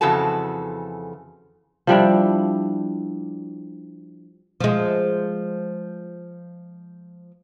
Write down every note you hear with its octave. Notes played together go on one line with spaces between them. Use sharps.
F2 C#3 E3 F#4 A4 A5
F3 G3 D4 E4
F3 G#3